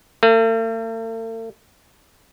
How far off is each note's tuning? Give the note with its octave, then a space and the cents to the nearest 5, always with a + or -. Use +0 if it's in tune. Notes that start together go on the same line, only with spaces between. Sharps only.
A3 +45